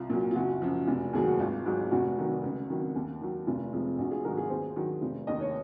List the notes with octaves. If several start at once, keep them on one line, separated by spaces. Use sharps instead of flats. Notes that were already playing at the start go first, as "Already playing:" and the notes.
Already playing: C2 F4
A#2 F#3
F4
F#1 F#4
F#2 F3
F1
D#2 D#3 F#3 G#4
F#4
G#1 F4
G#2 F#3
F1 F#4
F2 D#3 F#3
C#2
C3 D#3 F#3
D#2
D#3 F#3
F1 F4
F2 C3 F3 G#3
A#1 F#4
F4 G#4
G#2 D#3 F#3 F#4 A#4
F4 G#4
D#2 G#4 C5
D#3 F#3
F1
D#2 D#3 D#5
C#5